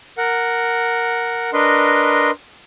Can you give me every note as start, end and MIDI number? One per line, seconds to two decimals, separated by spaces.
0.18 1.50 70
0.18 1.50 78
1.53 2.31 62
1.53 2.31 70
1.53 2.31 71
1.53 2.31 75
1.53 2.31 84